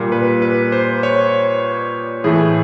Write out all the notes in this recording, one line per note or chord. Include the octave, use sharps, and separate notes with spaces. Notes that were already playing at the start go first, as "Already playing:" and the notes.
Already playing: A#2 G3 A#3
B4
B4
C5
C#5
A2 E3 A3 G#4